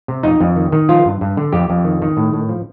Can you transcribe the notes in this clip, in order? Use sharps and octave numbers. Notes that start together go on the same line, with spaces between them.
C3
F2 D#4
F2
D#3
D#3
F3 F4
G2
G2
D3
F2 G4
F2
D#3
D#3
A2
A2
F3